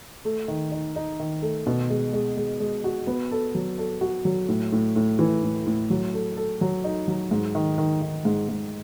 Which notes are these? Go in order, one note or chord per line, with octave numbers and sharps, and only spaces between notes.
A3
D#3
D#4
D#4
D#3
A3
B2
G#3
G#3
G#3
G#3
F#4
B3
A4
F#3
A4
F#4
F#3
A2
A2
A2
E3
A2
A2
F#3
A4
A4
F#3
D#4
F#3
G#2
D#3
D#3
D#3
G#2
G#2